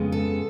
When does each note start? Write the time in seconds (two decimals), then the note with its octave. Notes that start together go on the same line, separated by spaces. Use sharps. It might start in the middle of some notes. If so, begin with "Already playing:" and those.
Already playing: F2 C#3 G#3 B3
0.12 A4